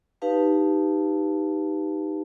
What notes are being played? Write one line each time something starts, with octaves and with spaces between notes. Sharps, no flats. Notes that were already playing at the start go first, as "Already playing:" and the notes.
D#4 G4 B4 F5 A5